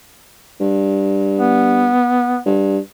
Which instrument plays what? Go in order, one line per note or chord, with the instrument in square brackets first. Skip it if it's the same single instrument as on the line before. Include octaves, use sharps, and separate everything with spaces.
[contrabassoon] G2
[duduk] B3
[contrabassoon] G2